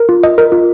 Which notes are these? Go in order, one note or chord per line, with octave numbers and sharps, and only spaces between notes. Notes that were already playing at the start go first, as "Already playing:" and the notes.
Already playing: A#4
F4
D#5
A#4
F4